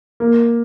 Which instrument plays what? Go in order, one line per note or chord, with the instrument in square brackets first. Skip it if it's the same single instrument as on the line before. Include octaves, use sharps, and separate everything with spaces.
[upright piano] A#3